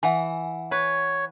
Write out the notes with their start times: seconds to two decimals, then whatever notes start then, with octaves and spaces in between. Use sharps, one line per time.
0.03 E3 F#5 G#5
0.71 B4 C#5